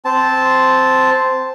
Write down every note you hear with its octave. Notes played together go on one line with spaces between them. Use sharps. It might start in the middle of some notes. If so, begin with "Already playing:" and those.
C4 A5